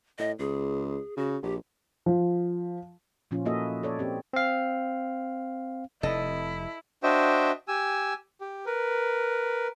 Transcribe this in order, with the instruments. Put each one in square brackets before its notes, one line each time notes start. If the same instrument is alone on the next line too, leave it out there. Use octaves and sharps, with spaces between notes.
[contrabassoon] A2 [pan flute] D#5
[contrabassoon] C#2 [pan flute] G#4
[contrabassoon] C#3 [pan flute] F#4
[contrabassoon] A#1 [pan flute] G4
[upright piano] F3
[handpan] A#2 F3 C#4 F4
A#3 E4 F#4 A4 D#5 E5
A4 C#5 D5
C4 G4
[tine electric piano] C4 F5
[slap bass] F1 C3 [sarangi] E4 [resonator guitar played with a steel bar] A4 D#5
[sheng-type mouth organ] D4 F#4 C5 D#5 E5 G5
G4 G#5 E6
G4
A#4 B4